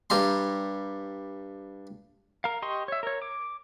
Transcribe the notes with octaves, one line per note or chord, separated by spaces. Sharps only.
G2 G3 A#5 C6
A#4 F5
G4 D#5 C6 C#6
C#5 E5
A#4 C#5
D6